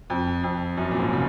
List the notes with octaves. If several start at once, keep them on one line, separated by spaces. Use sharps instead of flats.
F2
F2
F#2
A#2
G#2
C#3